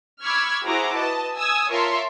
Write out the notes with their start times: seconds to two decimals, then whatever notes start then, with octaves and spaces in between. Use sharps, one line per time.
0.24 B5 C#6 D6 E6 F6 G#6
0.66 E4 F#4 G#4 C5 A#5 D6
0.97 B4 D#5 A5
1.36 G#5 D#6 E6 G#6
1.70 F4 A#4 C#5 E5 A5 C6